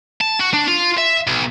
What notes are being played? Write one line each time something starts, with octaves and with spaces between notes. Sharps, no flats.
A5
F#4
D4
F4
E5
B1